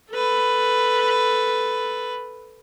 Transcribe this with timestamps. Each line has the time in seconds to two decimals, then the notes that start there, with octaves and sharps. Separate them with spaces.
0.11 A4 B4